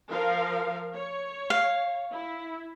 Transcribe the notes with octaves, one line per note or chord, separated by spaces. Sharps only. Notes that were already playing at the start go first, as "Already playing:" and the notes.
F3 A#4 F5
C#5
F5
E4